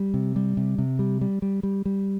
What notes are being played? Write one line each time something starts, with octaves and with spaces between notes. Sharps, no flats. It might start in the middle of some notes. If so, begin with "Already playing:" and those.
Already playing: G3
C3
G3
C3
C3
G3
G3
G3
G3
G3